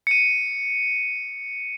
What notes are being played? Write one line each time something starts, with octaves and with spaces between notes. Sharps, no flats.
C#7 D#7